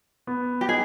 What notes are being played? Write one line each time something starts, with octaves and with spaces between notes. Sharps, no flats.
B3
G4
D#4 G#4